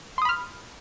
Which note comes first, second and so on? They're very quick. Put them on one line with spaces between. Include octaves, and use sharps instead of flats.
C6 D#6 B5 F6